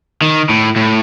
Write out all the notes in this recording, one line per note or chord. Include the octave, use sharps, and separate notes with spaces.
D#3
A2
A2